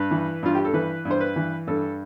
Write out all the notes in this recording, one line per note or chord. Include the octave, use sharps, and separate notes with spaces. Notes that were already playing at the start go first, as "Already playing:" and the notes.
Already playing: G2 B4
E3
G2 F4
G4
A4
E3 B4
G2
C5
B4
E3
G2 A4